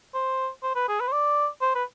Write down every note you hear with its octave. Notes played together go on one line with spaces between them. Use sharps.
C5
C5
B4
G#4
B4
C5
D5
C5
B4